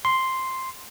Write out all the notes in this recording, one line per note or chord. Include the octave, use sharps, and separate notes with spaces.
C6